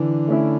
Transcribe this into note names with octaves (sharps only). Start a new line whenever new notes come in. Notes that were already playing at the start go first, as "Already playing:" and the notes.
Already playing: D3 E3
A3 C#4 E4